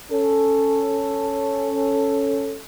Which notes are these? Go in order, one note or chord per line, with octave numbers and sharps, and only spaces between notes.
C#4 A4